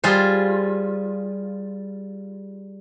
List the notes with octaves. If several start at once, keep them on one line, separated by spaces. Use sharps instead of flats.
G3 F4 G#4 C5